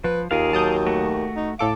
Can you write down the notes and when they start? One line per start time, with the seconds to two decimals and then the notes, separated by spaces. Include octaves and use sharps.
0.04 F3 B4
0.31 D#2 F4 G#4 A#4 F5
0.53 F#3 A5 D#6 G6
0.87 A3 F#4
1.37 D#4
1.59 A2 A4 F5 D6